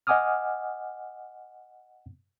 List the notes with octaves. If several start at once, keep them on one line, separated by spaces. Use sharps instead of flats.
D#5 F#5 G#5 D6 D#6 F6